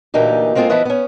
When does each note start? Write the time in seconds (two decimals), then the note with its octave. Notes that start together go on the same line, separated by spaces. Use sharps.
0.14 D2 A#2 E3 A#3 D#4 G4
0.55 G#3 A#3 C4 F4 G#4 A4
0.69 E3 F3 B3 E4 B4 D#5
0.85 B3 C#4